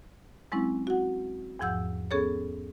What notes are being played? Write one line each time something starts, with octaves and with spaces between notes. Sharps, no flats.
F#3 G#3 C4 C#4 E4
F#4 F#5
E2 G#2 F3 F#5 E6 G6
B3 C#4 G#4 A4 C#5